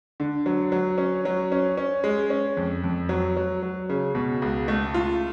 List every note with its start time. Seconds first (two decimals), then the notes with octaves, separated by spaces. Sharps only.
0.20 D3
0.46 F#3
0.72 F#3
0.98 C#4
1.25 F#3
1.52 C#4
1.77 C#4
2.04 G#3
2.30 C#4
2.57 F2
2.84 F2
3.09 F#3
3.36 F#3
3.63 F#3
3.89 C#3
4.15 B2
4.42 C#2
4.68 A3
4.94 F4